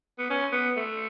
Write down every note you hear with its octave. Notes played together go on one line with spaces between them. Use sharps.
B3
C#4
B3
A3